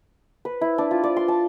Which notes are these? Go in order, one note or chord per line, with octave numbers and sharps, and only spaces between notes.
B4
E4
D4
F4
D5
C6
A5